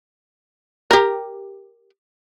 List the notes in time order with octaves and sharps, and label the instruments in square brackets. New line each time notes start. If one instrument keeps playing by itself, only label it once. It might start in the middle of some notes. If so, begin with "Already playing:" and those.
[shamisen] G4 A#4